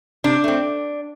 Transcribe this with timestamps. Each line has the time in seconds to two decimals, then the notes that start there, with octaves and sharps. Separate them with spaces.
0.24 C3 D4
0.44 A3 C4